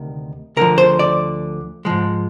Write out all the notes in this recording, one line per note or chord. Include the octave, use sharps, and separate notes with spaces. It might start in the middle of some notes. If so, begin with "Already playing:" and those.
Already playing: D2 C3 D#3
D2 D3 F3 A#4
C5
D5
G#2 F3 G#3